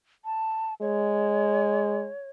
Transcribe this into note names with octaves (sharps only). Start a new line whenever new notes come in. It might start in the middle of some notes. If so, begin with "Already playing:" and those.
A5
G#3 C#5